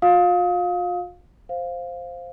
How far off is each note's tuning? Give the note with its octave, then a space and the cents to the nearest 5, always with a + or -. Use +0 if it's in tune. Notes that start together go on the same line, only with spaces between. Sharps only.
F4 +45 F5 +20 D#6 +30
C5 +0 F5 +0